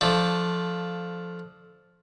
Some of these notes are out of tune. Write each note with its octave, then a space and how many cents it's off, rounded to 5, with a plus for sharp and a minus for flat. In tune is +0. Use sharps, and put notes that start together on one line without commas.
F3 +5 A3 -10 D4 +0